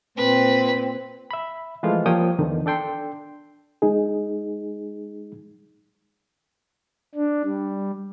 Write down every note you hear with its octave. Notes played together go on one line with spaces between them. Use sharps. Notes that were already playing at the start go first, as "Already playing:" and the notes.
A#2 C4 B4
E5 B5
E3 F3 G#3 A3 F4
F3 G3 A#3 C#5 G5 D#6
E2 D3 D#3
D4 A4 G5 C6
G#3 D#4 G#4
D4
G3